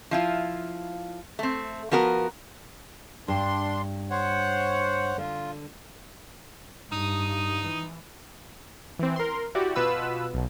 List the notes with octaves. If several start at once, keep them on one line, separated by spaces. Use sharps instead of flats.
F3 E4 F4
A3 C4
F3 B3 F#4 A#4
G2 D4 C6
C5 C#5 F#5
D3 F4
G2 D#4 D#6
E3
E3 C4
A#4 C6
E4 F#4 G4 D5
B2 B3 F4 B4 B5 E6
B1 B2